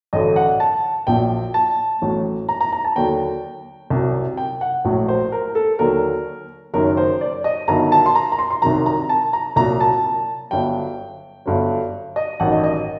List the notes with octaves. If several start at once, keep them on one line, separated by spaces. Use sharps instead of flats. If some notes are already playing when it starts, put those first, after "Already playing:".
A1 G2 D3 F#3 D#5
F#5
A5
A#1 A#2 F#3 G5
A5
A1 A2 F#3
A#5
A#5
A#5
A5
D#2 D3 F#3 G5
C2 C3 F#3
G5
F#5
A#1 A2 F#3
C5
A#4
A4
D#2 D3 F#3 A#4
F#1 F#2 D#3 F#3 A#4
C5
D5
D#5
G1 G2 D#3 F#3 A#5
A5
C6
A#5
A#5
C6
C6
C2 C3 D#3 F#3 A#5
A#5
A5
A#5
C2 A#2 F#3 A#5
A5
G1 G2 F#3 G5
G1 G2 D3 F#3
D#5
A1 G2 D#3 F#3 F#5
D#5
D#5